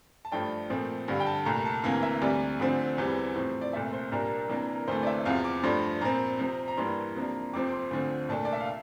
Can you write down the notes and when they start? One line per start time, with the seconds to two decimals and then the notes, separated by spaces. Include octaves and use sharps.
0.25 A5
0.32 G2 F3 A3 D4 G5
0.70 A#2 F3 A3 C4
1.08 G2 D3 G3 F5
1.20 G5
1.27 A5
1.45 C2 A#2 A3 A#5
1.65 A5
1.84 D2 C3 E3 A#3 F5
2.03 E5
2.22 D2 C3 G3 D5
2.60 D2 D3 F3 C4
2.98 E2 E3 G3 C4
3.36 A2 F3 C4
3.61 D5
3.73 C2 A#2 A3 C4 E5
3.93 C5
4.12 C2 A#2 G3 A#3 D4 A#4
4.49 C3 E3 A#3 D4
4.76 A#4
4.88 D2 C3 E3 A3 C5
5.03 D5
5.07 E5
5.25 E2 C3 F3 F5
5.44 D6
5.63 G2 F3 A3 D4 C6
6.01 A#2 F3 C4 A#5
6.39 C3 F3 C4
6.68 A#5
6.77 G2 E3 G3 A#3 D4 C6
7.15 C3 F3 A#3 D4
7.53 F2 C3 F3 C4 D6
7.67 D6
7.72 C6
7.91 D2 D3 F3 C4
8.29 C2 A#2 A3 D4 A5
8.45 D5
8.53 E5
8.60 F5